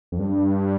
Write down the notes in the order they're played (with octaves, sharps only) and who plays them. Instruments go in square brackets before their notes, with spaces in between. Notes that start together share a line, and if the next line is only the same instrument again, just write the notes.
[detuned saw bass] F2
G2